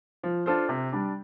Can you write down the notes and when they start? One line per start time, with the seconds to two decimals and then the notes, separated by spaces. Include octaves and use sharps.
0.23 F3
0.46 D4 F4 A4 C5
0.69 C3
0.92 G3 D4